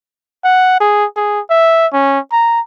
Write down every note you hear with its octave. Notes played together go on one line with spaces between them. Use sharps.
F#5
G#4
G#4
E5
C#4
A#5